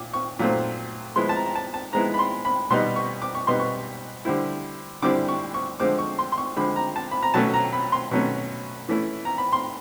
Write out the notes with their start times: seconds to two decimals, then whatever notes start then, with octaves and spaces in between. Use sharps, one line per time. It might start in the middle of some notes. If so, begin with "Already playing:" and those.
Already playing: A#2 D6
0.13 C#6
0.39 A#2 F#3 A3 C4
1.16 F3 G#3 B3 E4 C6
1.29 A5
1.36 A#5
1.46 A#5
1.55 A5
1.74 A5
1.93 F3 G#3 B3 E4 A#5
2.14 B5
2.19 C6
2.45 B5
2.70 B2 G3 B3 D#4 C6
2.96 C#6
3.22 D6
3.35 C#6
3.47 B2 G3 B3 D#4 C6
3.59 C#6
4.25 D3 G3 C4 E4
5.02 D3 G3 C4 E4 D6
5.28 C#6
5.54 C#6
5.80 D3 F3 G#3 C4 D6
5.98 C#6
6.19 C6
6.32 C6
6.38 C#6
6.56 D3 F3 G#3 C4 B5
6.76 A#5
6.96 A5
7.11 B5
7.23 A#5
7.34 B2 F#3 A3 C#4 A5
7.54 A#5
7.73 B5
7.92 C6
8.11 B2 F#3 A3 C#4
8.89 E3 A3 C#4 E4
9.25 A#5
9.38 B5
9.52 C6